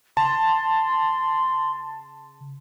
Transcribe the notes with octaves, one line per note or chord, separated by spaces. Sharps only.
C#3 A5 C6